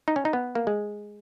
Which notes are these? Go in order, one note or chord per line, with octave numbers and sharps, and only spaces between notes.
D#4
C#4
D#4
B3
A#3
G#3